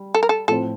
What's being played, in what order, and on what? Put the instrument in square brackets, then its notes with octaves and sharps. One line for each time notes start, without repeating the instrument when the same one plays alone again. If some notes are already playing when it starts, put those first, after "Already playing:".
Already playing: [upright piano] G3
[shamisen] A4
A#4
A4
[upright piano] A2 F3 C4 F4 C5 [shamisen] A4